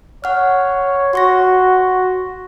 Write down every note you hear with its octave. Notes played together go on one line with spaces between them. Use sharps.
C#5 F#5 F6
F#4 C6 C#6 A#6